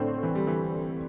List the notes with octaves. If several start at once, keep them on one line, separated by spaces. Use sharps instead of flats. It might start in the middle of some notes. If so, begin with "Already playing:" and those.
Already playing: A2 D3 A3 C4
E3
G3
E3